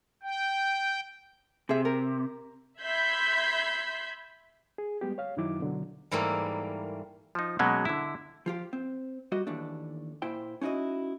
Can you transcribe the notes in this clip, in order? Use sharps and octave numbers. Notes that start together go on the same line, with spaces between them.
G5
C3 G#4 E5
A#4
E5 B5 C6 G6 G#6 B6
G#4
G3 G#3 B3 G4
C#5 F5
F#2 D#3 F#3 D#4 E4 D6
B2 D3 F#3
G#2 E3 G3 A3 A#3
F3 D#4
B2 F#3 G#3 A#3 C#4
D3 E4
F3 F4 G4
C4
G3 F#4 D#5
D#2 E3 A3 D4
A#2 E4 C5 G5
C#4 D#4 E4 F#4 D#5